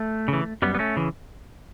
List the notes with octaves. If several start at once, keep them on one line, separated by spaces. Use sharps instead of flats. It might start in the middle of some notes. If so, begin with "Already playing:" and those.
Already playing: A3
C#3 E3
F#2 G3 B3
B3
A3 C#4
C#3 E3